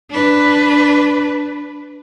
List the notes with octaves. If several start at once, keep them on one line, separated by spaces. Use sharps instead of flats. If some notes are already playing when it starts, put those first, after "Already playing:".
D4 B4